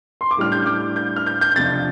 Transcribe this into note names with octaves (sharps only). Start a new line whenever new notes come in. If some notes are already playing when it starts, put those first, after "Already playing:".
C6
D6
A2 G3 D4 F6
G6
D6
G6
F6
G6
G6
F2 C3 F3 D4 A6